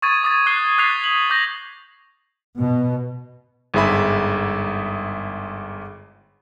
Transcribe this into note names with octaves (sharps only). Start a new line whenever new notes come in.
C#6 D#6 G#6 A6 D#7
D6 D#6 A6
D6 F#6 C7 G7
D6 F#6 A6 B6 C7 F7
D#6 F#7
D6 G6 A#6
B2
G1 G#2 G#4 E5 B5